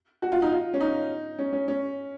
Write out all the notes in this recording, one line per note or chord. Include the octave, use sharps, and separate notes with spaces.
F#4
F4
D#4
F4
C#4
D#4
C#4
C#4
C#4